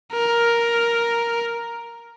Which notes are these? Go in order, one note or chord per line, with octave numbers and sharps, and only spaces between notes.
A#4